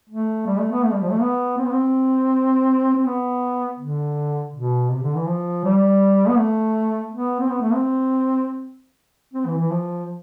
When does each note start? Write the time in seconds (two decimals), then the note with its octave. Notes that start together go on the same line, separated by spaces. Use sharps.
0.09 A3
0.47 G3
0.59 A3
0.72 B3
0.84 A3
0.93 G3
1.02 F3
1.11 A3
1.21 B3
1.58 C4
1.64 B3
1.71 C4
2.96 C4
3.06 B3
3.79 D3
4.54 B2
4.90 C3
5.03 D3
5.15 E3
5.27 F3
5.65 G3
6.28 B3
6.38 A3
7.12 B3
7.40 C4
7.49 B3
7.61 A3
7.74 C4
9.34 C4
9.46 E3
9.58 E3
9.71 F3